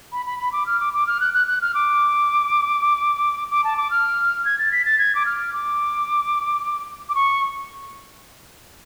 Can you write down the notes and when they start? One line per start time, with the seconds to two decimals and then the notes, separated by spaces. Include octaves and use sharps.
0.12 B5
0.26 B5
0.39 B5
0.53 D6
0.66 F6
0.80 D6
0.94 D6
1.07 F6
1.20 F#6
1.34 F#6
1.47 F#6
1.61 F6
1.74 D6
3.50 D6
3.64 A5
3.77 D6
3.91 F6
4.45 G#6
4.59 A6
4.72 B6
4.85 A6
4.99 G#6
5.15 D6
5.26 F6
5.53 D6
7.09 D6
7.15 C#6